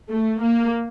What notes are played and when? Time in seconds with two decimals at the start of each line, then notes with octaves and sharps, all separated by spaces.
0.11 A3
0.42 A#3